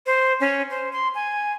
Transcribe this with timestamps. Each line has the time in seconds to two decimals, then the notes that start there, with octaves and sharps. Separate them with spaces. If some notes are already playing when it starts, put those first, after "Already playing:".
0.06 C5
0.40 C#4
0.70 C5
0.93 C6
1.15 G#5